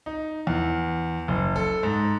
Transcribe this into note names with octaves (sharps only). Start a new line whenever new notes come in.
D#4
E2
F#1
A4
G#2